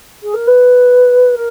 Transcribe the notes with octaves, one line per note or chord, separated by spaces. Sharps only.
G#4
A#4
B4
A#4